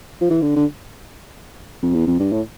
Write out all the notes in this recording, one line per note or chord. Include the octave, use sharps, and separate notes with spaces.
F3
E3
D3
D3
F2
E2
F2
G2
A2